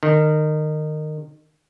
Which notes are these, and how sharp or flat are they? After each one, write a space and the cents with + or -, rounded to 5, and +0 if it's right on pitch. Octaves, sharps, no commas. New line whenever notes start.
D#3 -20